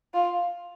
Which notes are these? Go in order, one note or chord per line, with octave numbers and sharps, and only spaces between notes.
F4